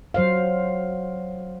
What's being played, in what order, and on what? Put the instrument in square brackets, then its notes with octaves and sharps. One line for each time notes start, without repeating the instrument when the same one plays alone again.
[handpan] F#3 C5 F5